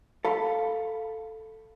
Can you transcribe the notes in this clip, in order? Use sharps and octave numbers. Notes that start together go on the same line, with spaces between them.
A4 F5 B5